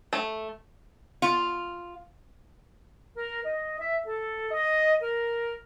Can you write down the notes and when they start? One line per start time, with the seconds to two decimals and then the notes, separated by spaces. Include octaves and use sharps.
0.13 A3
1.22 F4
3.17 A#4
3.45 D#5
3.79 E5
4.06 A4
4.51 D#5
5.01 A#4